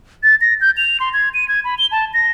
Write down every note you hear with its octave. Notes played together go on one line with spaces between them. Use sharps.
A6
A#6
G6
F7
C6
G#6
D#7
G#6
B5
G7
A5
A#6